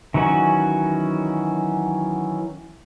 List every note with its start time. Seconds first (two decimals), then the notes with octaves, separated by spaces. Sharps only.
0.14 D#3 E3 F#3 C#4 F#4